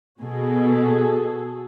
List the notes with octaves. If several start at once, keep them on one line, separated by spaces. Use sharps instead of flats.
B2 F#4 G#4 A4